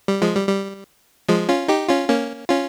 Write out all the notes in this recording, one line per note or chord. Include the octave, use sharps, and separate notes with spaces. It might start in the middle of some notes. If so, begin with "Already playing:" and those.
G3
F3 G#3
G3
G3
F3 G#3
C#4 F4
D#4 G4
C#4 F4
A#3 C#4
C#4 F4